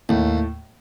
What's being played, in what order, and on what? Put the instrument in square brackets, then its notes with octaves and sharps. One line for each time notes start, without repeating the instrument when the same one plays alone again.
[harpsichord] D#2 [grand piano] A2 A3